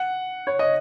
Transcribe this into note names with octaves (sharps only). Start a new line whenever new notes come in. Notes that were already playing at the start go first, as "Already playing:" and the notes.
Already playing: F#5
C#5
D#5